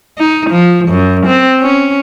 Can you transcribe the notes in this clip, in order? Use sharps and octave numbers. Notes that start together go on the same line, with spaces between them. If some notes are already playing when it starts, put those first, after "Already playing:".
D#4
F3
F#2
C4
C#4